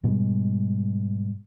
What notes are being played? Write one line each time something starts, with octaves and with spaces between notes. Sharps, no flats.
G#2 B2 G3 G#3